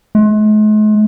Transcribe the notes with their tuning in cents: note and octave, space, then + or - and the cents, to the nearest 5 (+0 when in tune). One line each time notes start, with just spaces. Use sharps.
G#3 +45